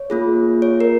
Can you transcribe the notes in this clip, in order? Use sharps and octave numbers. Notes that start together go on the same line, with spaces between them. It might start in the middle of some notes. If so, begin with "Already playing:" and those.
Already playing: C#5
A#3 F4 G#4
C#5
A#4